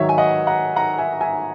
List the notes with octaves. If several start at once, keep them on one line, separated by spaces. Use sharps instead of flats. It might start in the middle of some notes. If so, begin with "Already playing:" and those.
Already playing: G#2 D#3 F#3 C#5 E5
G#5
D#5 F#5
F#5 A#5
F#5 A#5
E5 G#5
E5 G#5